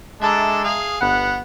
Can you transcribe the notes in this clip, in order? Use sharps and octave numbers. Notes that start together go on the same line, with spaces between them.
G#3 D4 A4 E5 A5 A#5
G#4 F5
G1 B3 F#5 F#6